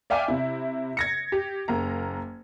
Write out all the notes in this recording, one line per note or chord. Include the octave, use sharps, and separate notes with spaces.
D5 E5 F5 G5 G#5 D6
C3 E4
G#6 A#6 C#7
G4
F#1 A#3 A#5